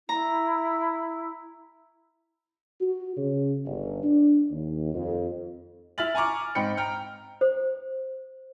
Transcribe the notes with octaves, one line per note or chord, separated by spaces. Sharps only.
E4 A#5
F#4
C#3
G1
D4
D#2
F2
E4 E5 F6 A6 F#7
G#5 A#5 C#6 D6 F6
G#2 C4 D#4 G5 B5 C#7
G5 A#5 F6
C5